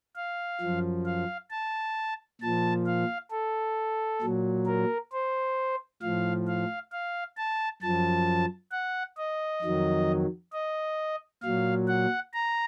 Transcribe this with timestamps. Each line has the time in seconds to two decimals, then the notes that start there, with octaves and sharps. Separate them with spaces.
0.16 F5
0.61 F#2 F3
1.05 F5
1.50 A5
2.41 A#2 F3 A5
2.86 F5
3.31 A4
4.21 A#2 F#3
4.66 A#4
5.12 C5
6.01 A2 F3 F5
6.47 F5
6.92 F5
7.37 A5
7.82 F#2 F3 A5
8.72 F#5
9.17 D#5
9.62 F2 D#3 F#3
10.52 D#5
11.42 A#2 F#3 F5
11.88 F#5
12.33 A#5